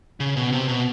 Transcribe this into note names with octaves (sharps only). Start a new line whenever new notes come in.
C#3
B2
C3
B2